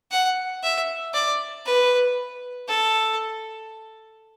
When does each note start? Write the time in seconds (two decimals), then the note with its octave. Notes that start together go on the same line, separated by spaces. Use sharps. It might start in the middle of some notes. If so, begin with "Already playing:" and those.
0.11 F#5
0.63 E5
1.14 D5
1.66 B4
2.69 A4